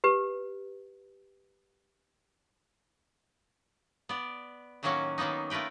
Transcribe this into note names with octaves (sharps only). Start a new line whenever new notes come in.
G4 B4
B3 D5
A2 D#3 F#3 A#3 C#4 F#4
D#3 F#3 A#3 B3 D#4
A3 F4 A#4 B4 G5